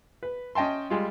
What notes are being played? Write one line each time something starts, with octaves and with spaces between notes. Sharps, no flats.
B4
C#4 D#5 G5 A5 C6
G3 G#3 F4